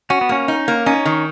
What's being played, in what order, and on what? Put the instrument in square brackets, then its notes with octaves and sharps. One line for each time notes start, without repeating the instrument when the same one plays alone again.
[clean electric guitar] C#4 [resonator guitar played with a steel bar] F#4
[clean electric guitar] B3
[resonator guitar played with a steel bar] A#3 [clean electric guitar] C#4
[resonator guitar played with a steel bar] D#4
A#3
[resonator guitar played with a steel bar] C#4 [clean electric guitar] D#4
[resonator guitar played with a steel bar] D#3